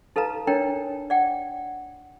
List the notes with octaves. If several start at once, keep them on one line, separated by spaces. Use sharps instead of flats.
D#4 A4 B4 F5 A#5
D4 D#4 A#4 C#5 G5 A#5
D5 F#5 G5